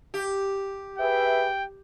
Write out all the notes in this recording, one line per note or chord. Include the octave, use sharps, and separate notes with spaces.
G4
G#4 B4 E5 G5